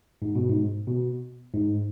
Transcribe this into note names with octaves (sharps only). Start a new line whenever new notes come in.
G#2
B2
G#2
B2
G#2